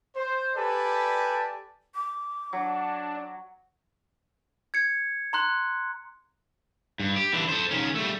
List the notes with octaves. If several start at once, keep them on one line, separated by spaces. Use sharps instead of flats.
C5
G4 A4 B4 D5 G#5 A5
D6
F#3 D4
G#6 C#7
A#5 C6 F#6
G2
G4
E3 D4
A4 C5
D#3 C#4
G3 A3